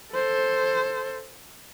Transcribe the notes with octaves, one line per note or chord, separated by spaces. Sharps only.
A4 C5